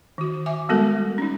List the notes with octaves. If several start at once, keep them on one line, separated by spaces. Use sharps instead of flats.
D#3 F#4
E5 G#5 D6
G3 G#3 B3 F#4 A4 A#4
C#4 D#4